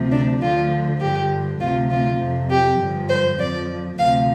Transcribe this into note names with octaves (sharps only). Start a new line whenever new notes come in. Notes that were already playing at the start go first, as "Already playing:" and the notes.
Already playing: D2 C3 F3
D4
D2 D3 F3 F4
G2 D3 F3 G4
D2 C3 F3 F4
F4
F2 C3 F3
G4
G2 D3 F3
C5
F2 F3 D5
D2 C3 F3 F5